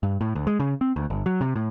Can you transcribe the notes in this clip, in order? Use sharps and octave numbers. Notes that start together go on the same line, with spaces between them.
G2
A2
D2
G#3
C#3
C4
D2
G1
F#3
C3
A2